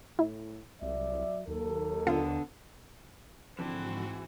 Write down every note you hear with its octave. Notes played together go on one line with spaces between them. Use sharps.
A2 E4
C2 F#3 D5 E5
D#2 F#3 A4 A#4
D3 B3 D4 F4
F2 G#2 D3 E3 C4 F#4